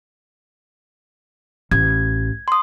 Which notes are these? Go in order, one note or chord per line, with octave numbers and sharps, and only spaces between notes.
A1 G#6
C6 D#6